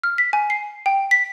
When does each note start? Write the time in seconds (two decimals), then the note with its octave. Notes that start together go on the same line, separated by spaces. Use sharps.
0.04 F6
0.18 B6
0.33 G#5
0.50 C7
0.86 G5
1.11 B6